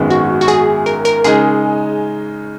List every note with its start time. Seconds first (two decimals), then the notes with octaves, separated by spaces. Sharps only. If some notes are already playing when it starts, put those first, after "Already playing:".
Already playing: G#1 F#2 D#3 G#3 B3
0.10 F#4
0.41 F#4
0.48 G#4
0.86 A#4
1.05 A#4
1.24 C#3 G#3 D#4 G#4